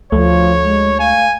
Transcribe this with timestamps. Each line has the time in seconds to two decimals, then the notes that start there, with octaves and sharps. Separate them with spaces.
0.12 D2 F3 A3 C#5
0.64 G#3
1.00 F5 G#5